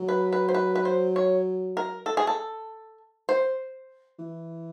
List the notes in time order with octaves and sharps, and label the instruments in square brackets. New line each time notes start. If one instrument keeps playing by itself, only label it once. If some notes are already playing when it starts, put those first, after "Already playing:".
Already playing: [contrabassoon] F#3
[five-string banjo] B4
B4
C5
B4
B4
C5
C#5
A#4
A4
G#4
A4
C5
[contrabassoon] E3